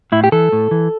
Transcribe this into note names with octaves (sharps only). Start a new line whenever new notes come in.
A2 E4
G4
E3 A4
A2
E3